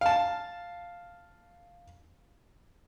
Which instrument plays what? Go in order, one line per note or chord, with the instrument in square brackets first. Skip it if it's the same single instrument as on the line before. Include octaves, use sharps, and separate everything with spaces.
[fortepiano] F5 A5